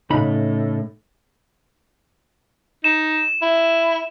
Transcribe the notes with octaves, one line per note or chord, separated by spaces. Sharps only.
A2 C#3 D#4 B5
D#4 E7
E4